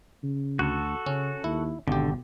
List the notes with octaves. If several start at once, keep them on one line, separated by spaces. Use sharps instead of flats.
C#3
D2 F#4 A4
C#3 C#4
D#2 E4
G#1 B2 D3 G4